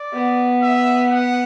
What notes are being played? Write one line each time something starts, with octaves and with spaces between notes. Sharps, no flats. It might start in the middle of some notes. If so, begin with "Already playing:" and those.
Already playing: D5
B3
E5
F#5